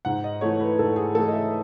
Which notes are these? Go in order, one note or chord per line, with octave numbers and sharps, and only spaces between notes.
G#2 F#5
D#5
E3 A3 C#5
B4
G#2 A4
G#4
E3 A3 A4
D#5
E5